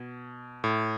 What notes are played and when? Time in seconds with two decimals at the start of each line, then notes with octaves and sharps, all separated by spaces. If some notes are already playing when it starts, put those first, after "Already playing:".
Already playing: B2
0.64 A2